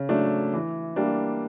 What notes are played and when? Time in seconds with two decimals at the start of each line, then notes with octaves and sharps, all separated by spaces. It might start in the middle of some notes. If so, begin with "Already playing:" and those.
Already playing: C#3
0.09 F#3 A3 D4
0.53 E3
0.96 G3 A#3 D4